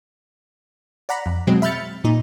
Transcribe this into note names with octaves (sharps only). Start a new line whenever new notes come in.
D5 F#5 A#5 B5
F2
B2 F#3 G#3 C4
E5 B5 F6 G6 A6 C#7
A#2 D#4